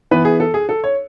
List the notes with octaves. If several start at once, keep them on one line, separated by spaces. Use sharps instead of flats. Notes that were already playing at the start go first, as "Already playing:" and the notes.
E3 B3 B4
G#4
A4
G#4
A4
C#5